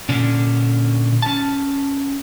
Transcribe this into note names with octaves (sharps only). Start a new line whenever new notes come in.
A#2 D3 C#4 D4
C#4 A5